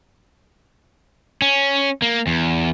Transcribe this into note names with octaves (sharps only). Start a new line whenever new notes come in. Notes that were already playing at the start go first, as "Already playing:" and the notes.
C#4
A#3
E2